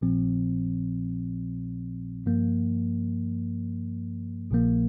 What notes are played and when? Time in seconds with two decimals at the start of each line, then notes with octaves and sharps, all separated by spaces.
0.01 A#1 A#2 F3 C4
2.26 G2 F3 A#3
4.51 A#1 A#2 F3 A#3